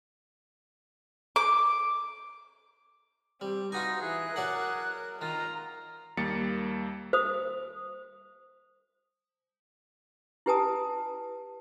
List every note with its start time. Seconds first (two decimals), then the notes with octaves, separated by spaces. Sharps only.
1.36 D6
3.41 G3 C4
3.72 D#4 F4 F#4 B4 G#5 A#6
4.01 E3 G#4 F#6
4.36 F#3 A#4 D5 F#5
5.21 D#3 F4 A#5
6.17 D#2 G3 A#3 A6 C#7
7.13 C5 D#6
10.46 E4 G4 B4 G#5 A5 D#6